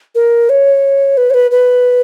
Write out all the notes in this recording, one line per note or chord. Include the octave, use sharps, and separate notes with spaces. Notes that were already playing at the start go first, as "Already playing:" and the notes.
A#4
C#5
B4
C#5
B4
B4